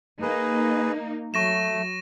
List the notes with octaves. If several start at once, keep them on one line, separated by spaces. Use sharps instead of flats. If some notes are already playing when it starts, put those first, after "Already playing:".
A#3 D#4 G#4 B4
F#3 A3 C#6 A#6 E7